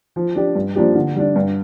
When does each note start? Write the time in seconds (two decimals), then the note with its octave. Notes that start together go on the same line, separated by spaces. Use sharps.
0.16 F3
0.36 D4 G4
0.55 G2
0.76 F3 A#3 D4 G4
0.95 D3
1.15 G3 D4
1.36 G2